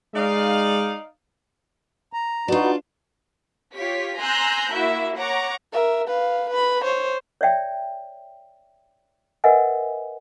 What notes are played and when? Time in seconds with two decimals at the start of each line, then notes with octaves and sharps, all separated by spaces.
0.14 G#3 D#4 D5 F5
2.13 A#5
2.48 D4 D#4 F4 F#4 B4
3.75 F4 G4 C#5 B6
4.18 G#5 A#5 C6 E6 F#6 G6
4.73 A#3 E4 F#4 E5
5.17 C#5 F#5 A#5 C#6 D6
5.73 A#4 E5
6.08 B4 F5
6.50 B4 B5
6.84 C5 C#5
7.41 C#5 D5 E5 G5
9.44 A#4 B4 D#5 E5 F#5 G#5